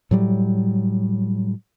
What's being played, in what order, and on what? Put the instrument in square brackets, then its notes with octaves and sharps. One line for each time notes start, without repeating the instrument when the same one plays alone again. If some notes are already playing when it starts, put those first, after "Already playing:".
[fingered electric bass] A2 F#3 G3